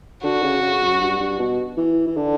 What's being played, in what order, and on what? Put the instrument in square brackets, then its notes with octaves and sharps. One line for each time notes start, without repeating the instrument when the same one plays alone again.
[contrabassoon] D3 [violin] F#4
[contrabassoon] C#3
C#3
F#2
G2
G2
B2
E3
E3
D3